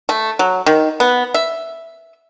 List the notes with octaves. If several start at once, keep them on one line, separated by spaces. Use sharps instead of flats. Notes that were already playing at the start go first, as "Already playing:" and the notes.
A3
F#3
D#3
B3
E5